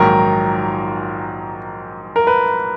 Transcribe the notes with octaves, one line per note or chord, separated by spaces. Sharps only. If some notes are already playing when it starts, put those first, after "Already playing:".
Already playing: A#1 G#2 D#3 F#3 A#4
A#4
B4